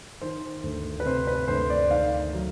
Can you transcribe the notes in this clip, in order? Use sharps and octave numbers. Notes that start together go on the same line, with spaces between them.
D#3 C5
D2
B4
C3 C5
B4
D2 C5
D5
D#3 F5
F#3